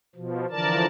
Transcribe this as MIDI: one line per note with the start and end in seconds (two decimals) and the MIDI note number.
0.15 0.46 47
0.15 0.46 53
0.50 0.86 50
0.50 0.86 52
0.50 0.86 53
0.50 0.86 70
0.50 0.86 74
0.50 0.86 81